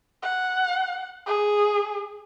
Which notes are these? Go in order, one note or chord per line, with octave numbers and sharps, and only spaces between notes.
F#5
G#4